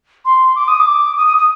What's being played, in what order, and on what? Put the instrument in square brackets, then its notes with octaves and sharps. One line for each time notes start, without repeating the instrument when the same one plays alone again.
[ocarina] C6
D6
D#6
D6
D#6
D#6
D#6